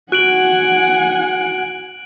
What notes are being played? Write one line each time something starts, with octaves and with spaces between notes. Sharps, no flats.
F#4 F#5 G#5 F#6 D7 F#7